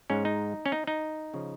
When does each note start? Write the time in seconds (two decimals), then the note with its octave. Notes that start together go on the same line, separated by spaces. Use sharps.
0.10 G#2 G#3 C#4
0.25 D#4
0.66 C#4
0.72 D#4
0.87 D#4
1.34 C#3 F3